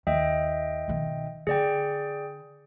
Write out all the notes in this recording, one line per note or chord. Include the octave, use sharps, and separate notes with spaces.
D#2 D#5 E5 G5
B1 D#3
D3 G#4 D5 G5